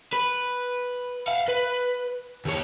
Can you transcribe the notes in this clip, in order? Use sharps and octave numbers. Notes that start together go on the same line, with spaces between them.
B4
F5 F#5
B4
D#2 C#5